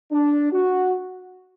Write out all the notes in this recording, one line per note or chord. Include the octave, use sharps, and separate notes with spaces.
D4
F#4